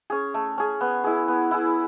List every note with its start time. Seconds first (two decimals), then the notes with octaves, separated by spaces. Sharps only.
0.10 C#4 G#4
0.34 A3
0.58 C#4 G#4
0.81 B3
1.04 E4 G#4
1.28 B3
1.51 E4 G#4